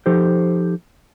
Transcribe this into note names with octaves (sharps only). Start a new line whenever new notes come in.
F3 D#4 G4 A4 C5